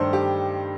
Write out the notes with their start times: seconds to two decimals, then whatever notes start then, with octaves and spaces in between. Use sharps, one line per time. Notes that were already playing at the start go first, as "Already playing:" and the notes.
Already playing: G2 D#3 A3 D4 A4 C5
0.13 G4